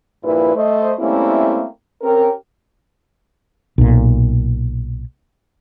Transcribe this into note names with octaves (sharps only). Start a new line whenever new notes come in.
G2 A#2 F3 E4 B4
A3 C5 D#5
G3 A3 A#3 C4 C#4 E4
C4 C#4 G4 A#4
B1 A#2